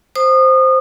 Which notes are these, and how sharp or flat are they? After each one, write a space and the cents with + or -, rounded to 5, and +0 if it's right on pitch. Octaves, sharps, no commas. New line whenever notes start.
C5 +0 D#6 -30